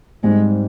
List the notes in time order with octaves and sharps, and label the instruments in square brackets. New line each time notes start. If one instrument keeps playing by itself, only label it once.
[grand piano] G#2 G3 C4 [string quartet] G#3